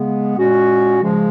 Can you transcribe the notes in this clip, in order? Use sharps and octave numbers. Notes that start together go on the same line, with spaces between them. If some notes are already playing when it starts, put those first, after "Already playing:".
Already playing: C#3 G#3 B3
A#2 G#3 C#4 F#4
C#3 F3 G#3